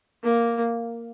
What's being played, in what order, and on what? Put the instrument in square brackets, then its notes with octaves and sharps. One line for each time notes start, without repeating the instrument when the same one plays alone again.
[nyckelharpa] A#3